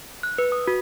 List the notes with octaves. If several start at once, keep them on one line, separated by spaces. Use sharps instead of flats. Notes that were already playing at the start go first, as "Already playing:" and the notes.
F#6
B4
D#6
F#4